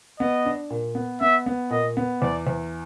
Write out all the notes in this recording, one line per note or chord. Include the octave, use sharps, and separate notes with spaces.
B3 D#5
D4
A#2
B3
B3 E5
B3
A#2 D#5
B3
E2 D5
E2